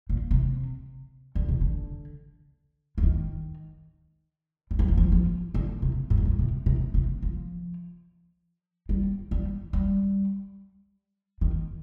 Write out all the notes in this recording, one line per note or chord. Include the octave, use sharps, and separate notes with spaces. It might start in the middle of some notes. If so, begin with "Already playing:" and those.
A#2
C3
D3
C3
D3
F3
D#3
G3
F3
D#3
F3
F3
D3
C3
G#2
G2
G#2
C3
C3
C3
F3
G3
G3
G3
D#3